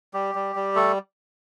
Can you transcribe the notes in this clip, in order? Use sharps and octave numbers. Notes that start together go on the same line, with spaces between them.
G3 G4
G3
G3
A3 A4